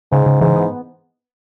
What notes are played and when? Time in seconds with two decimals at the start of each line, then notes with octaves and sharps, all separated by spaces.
0.12 G#2 C#3
0.26 C#3
0.41 G#2 E3
0.56 B3